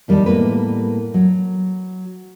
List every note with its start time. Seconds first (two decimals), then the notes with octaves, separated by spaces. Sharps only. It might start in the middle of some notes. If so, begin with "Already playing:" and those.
0.08 E2 D#3 G3 D#4 D5 A5
0.26 A2 G3 A#3 B3 B4
1.14 F#3